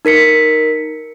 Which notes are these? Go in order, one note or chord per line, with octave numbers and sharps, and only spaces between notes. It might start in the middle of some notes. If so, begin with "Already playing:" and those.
D#4 A#4 B6 C#7